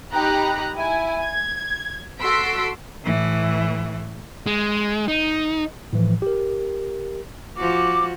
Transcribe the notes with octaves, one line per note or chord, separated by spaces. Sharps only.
D#4 G4 A#5 B5 F#6
E4 G#5
G#6
F#4 A4 C6 E6 B6 D7
A2 E3
G#3
D#4
A2 E3 F3
G4 A#4
F3 F#4 D6